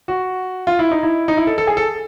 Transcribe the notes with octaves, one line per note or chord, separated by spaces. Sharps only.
F#4
F4
E4
D#4
E4
D#4
E4
A4
A4
G#4
A4